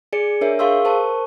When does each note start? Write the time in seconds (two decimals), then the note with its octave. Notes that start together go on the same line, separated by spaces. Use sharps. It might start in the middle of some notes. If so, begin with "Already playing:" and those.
0.13 G#4 D5 G#5 C#7
0.41 D4 A#4 C#5 E5 G#5
0.59 G#4 A#4 F5 C6 C#6 E6
0.85 A#4 C5 A5 C#6